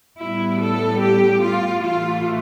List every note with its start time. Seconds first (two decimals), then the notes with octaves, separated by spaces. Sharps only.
0.19 A2 G3 B3 E4
0.60 A4
1.01 G4
1.41 F4
1.81 A2 E3 A3 F4